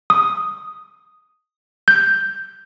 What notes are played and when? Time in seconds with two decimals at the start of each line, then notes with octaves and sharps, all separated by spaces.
0.10 D#6
1.88 G6